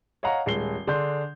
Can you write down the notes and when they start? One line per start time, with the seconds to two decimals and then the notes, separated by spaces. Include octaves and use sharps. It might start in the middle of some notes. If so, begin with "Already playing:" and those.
0.23 C#5 D#5 F5 F#5 A#5
0.46 D#1 G#3 C7 G7
0.87 D3 D4 G#4 C6 G6